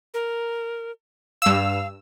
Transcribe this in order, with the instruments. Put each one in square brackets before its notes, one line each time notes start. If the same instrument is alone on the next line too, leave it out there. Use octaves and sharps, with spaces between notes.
[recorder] A#4
[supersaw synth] G2 E6 [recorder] F5